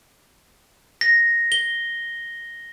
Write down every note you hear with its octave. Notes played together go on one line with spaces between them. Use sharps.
A#6
G7